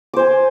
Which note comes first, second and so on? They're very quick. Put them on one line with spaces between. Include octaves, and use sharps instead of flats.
D6 C5 G#5